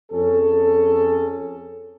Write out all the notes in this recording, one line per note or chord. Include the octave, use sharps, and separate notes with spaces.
F2 C#4 G#4 A4